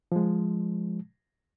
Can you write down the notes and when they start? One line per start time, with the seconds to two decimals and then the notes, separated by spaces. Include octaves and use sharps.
0.12 F3 G#3